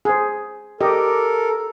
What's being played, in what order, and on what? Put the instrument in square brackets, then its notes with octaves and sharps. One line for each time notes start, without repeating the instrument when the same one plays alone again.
[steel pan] G#4 C5
[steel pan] G4 D#5 [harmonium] A4 A#4